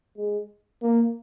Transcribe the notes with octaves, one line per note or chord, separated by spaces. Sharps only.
G#3
A#3